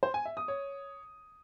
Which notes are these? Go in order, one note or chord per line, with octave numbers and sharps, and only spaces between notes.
C5
G#5
E5
D#6
C#5